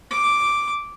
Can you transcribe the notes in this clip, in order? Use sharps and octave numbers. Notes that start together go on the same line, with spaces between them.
D6